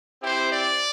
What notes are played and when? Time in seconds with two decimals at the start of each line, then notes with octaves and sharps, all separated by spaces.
0.22 C4 E4 G4 C5
0.50 D5